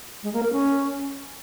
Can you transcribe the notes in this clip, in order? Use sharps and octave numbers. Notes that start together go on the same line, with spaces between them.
G#3
A#3
A#4
C#4